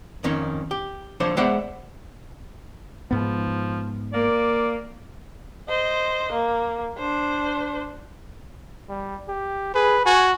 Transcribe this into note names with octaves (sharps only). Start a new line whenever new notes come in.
F2 D#3 C#4 D#4
G4
D3 F3 D4 A4 C5 C#5
G#3 B3 C5 D5 E5 F#5
G#2 F3 B3
A#3 D5
C5 D#5
A#3
D4 C5
G3
G4
G#4 B4
F#4 G#5